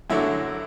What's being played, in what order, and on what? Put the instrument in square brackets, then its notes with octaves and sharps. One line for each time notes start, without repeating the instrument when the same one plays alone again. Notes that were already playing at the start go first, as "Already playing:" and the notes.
[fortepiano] F#2 D3 F#3 A3 E4